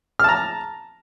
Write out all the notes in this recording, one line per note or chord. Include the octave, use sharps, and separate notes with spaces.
A5 A#5 F6